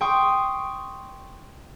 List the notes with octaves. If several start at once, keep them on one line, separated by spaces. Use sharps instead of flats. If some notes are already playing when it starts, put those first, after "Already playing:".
G5 C6 C#6 D#6